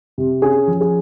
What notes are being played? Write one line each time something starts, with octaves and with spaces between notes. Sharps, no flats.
C3
C#4 G#4
F3
G#4